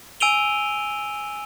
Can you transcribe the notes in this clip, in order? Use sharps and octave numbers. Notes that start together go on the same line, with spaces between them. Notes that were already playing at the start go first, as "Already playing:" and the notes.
G#5 E6 D7 D#7 F7 G7